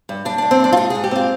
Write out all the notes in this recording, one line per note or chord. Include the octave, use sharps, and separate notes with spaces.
G2
G2 D4
G2 D4
C4
G2 D4
F4
G#2 D#4
G#2 G#4
G4
C4 F4